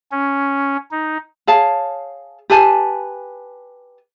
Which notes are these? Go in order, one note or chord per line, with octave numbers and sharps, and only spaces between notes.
C#4
D#4
G#4 C#5 F5 A5
G4 B4 G#5 A5